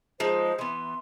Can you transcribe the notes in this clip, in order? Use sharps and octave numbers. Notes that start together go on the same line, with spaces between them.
F3 G#3 D#4 C5
E3 B3 C6